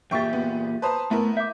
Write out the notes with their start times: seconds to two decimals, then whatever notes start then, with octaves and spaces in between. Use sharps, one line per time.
0.11 E2 A#2 G4 E5 G5 C#6 A6
0.33 B3
0.82 B4 C5 A5 A#5 C6 D#6
1.11 A3 B3 E4 A#4
1.37 E5 D6 G6